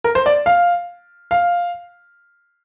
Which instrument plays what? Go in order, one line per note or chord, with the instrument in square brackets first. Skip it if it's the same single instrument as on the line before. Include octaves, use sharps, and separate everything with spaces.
[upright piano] A#4
C5
D5
F5
F5